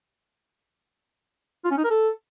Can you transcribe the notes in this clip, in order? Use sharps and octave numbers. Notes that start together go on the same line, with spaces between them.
F4
C#4
D#4
A#4
A4